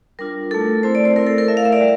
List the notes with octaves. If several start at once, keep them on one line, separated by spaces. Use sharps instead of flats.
G3 D4 F4 A#4
A3 E4 A4
A3 C4 E4 C5
D5
C5
A3 E4 A#4
A4
A#4
A3 E4 E5
F5
E5
D5
G3